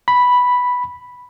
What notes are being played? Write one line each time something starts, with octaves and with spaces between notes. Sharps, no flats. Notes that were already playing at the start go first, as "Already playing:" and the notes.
B5